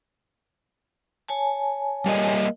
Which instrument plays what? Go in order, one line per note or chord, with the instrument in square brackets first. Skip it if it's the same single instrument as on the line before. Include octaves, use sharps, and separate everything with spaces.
[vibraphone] C#5 G#5 A5
[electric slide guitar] G3 A#3 D#5